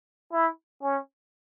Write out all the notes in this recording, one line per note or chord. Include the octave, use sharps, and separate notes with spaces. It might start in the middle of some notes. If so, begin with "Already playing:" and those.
E4
C#4